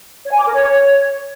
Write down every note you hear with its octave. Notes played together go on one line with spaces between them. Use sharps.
C#5
G#5
D6
A#4
C#5